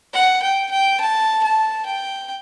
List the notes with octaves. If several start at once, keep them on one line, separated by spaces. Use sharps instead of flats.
F#5
G5
G5
A5
A5
G5